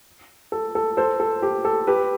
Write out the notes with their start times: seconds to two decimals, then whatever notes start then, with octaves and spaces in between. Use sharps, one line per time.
0.52 A4
0.75 A4
0.97 A4 C5
1.20 A4
1.42 G4
1.65 A4
1.87 G4 B4